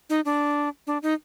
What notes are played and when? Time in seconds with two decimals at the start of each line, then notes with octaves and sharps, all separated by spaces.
0.10 D#4
0.25 D4
0.87 D4
1.03 D#4